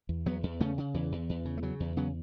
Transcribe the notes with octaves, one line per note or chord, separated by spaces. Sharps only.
E2
E2 F#3 B3
E2
C#3 A3 C#4
C#3
E2 E3
E2
E2
C#3
A3
C#3 F#3
E2
C#3 F#3 B3